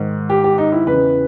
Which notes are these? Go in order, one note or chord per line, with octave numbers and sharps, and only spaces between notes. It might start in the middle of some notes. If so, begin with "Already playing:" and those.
Already playing: G#2 D#3
G4
G4
D#4
E4
E2 C#3 E3 B4